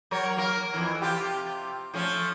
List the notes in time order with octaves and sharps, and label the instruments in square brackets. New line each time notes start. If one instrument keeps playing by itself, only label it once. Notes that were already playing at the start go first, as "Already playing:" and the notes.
[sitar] F#3 A#4 C#5
A#3 A#4
F2 E3
C3 F4 G4
F3 A3 C#4